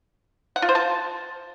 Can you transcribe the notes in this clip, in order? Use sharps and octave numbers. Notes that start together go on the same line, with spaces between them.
F#5
F4
C5
A5